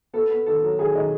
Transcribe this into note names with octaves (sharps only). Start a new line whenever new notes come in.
B3 A4
B3
D#3 A4
F#3
D#3 G#4
D#3 D#5